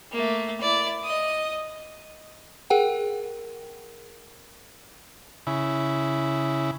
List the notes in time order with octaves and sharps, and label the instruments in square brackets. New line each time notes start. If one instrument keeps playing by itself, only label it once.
[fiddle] A3 A#3
E4 D5
D#5 D#6
[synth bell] G#4 A#4 F#5 G5
[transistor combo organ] C#3 E4